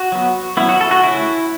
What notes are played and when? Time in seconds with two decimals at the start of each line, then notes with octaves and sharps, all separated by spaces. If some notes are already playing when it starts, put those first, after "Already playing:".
Already playing: F#4
0.12 F#3 B3
0.57 F#3 B3 E4
0.69 F#4
0.81 A4
0.91 F#4
1.03 C#3 A3 C#4 E4